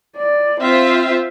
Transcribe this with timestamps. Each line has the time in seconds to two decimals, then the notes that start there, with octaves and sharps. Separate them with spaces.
0.16 D5
0.60 C4 F4 C5 E5